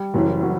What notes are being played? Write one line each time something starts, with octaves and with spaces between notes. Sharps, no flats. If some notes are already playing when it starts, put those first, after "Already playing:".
Already playing: G3
F#1 F#2 E3
F#3